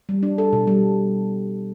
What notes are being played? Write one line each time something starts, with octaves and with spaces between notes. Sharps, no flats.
G3
D4
A4
B2
G3